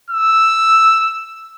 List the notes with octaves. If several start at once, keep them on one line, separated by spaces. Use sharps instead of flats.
E6